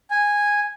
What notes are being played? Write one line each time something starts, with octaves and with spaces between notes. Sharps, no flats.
G#5